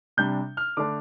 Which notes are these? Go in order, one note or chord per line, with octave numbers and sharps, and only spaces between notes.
C3 G3 D4 G6
F6
D3 A3 D4 D6